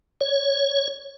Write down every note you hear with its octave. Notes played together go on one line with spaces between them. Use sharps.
C#5